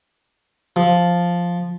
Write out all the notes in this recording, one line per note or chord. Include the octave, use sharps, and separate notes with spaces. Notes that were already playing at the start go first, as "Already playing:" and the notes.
F3